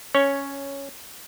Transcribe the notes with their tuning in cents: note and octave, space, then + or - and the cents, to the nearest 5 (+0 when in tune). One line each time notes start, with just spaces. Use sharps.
C#4 +0 C#5 +0